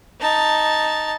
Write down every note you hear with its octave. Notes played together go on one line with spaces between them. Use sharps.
D#4 A5